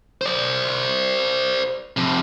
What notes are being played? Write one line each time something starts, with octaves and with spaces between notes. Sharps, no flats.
C5 D5
F2 C3